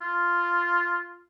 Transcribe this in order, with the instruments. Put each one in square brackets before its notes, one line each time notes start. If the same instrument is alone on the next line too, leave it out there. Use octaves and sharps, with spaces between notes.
[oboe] F4